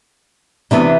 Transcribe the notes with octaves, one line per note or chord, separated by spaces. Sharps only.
C3 E3 B3 D4